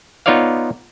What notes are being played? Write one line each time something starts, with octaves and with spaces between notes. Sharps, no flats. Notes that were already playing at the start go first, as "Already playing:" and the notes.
B3 D#4 F4 C#5 D5 F5